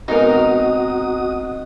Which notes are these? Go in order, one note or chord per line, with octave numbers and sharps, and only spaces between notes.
G#2 B2 C4 D#4 F#4 A#4 D#5 D#6